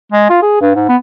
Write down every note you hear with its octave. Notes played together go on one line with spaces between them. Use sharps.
G#3
F4
G#4
G2
G#2
B3